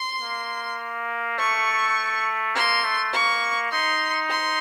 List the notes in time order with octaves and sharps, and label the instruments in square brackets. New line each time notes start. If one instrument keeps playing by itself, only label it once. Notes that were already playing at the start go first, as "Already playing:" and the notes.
Already playing: [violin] C6
[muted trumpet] A#3
[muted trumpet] A3 [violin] C#6
[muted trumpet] A#3 [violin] C6
[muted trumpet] A3
[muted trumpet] A#3 [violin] C#6
[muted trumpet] D#4 [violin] C6
[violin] C6